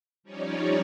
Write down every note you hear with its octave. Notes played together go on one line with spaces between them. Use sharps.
F3 G3 C#4 D#4 C#5 D5